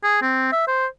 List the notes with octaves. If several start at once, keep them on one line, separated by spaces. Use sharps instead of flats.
G#4
C4
E5
C5